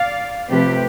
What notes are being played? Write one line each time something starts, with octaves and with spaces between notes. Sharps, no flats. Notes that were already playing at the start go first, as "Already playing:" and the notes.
Already playing: D5 F5
C3 F3 A3 C4 G4 B4